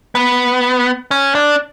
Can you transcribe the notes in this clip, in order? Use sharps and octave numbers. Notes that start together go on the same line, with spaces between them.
B3
C#4
D4